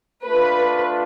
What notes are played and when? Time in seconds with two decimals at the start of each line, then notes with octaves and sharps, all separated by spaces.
0.24 A3 D4 F4 B4